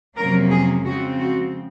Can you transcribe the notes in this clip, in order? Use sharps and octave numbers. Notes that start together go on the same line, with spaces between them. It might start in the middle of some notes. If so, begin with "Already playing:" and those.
F2 C3 F#3 A#3 C#4 A#4
G#4
C#3 F3 G#3 C4 F#4
F#4